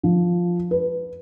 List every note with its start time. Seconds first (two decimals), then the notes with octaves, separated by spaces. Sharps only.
0.03 F3
0.71 B4